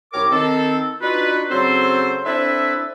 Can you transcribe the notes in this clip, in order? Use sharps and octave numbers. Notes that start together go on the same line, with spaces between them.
C2 G4 A#4 C#5 D6
D#3 C4 A4
D4 D#4 F4 F#4 B4
C#3 F#3 C4 A4 C5
C4 D4 E4 A4 B4 E5